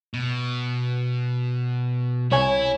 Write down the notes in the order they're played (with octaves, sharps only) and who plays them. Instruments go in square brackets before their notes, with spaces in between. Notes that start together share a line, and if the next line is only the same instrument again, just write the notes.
[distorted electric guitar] B2
[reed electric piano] C2 C#5 G#5 [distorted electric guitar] E4